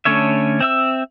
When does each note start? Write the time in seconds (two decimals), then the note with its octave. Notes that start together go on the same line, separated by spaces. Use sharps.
0.05 D3 A3 C#4 C#5 E5
0.61 C4 E5 E6